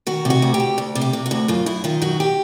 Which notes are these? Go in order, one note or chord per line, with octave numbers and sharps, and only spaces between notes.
D#3 F#4
C3
F#4
D2
G4
D2
D2
C3
G4
C3
F#4
D2
F#2 F4
F#2 E4
D#3 F4
F#2 F#4
G4